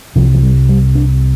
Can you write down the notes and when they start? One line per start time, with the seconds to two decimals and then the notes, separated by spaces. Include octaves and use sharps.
0.16 C2 C3 F3
0.34 F3
0.43 G3
0.69 G3
0.95 D4